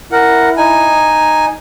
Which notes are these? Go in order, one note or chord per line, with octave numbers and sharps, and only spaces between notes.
E4 A#4 F#5
D#4 G#5